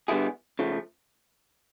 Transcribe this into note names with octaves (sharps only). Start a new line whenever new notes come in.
D3 G3 B3 E4 G#4
C#3 F3 A3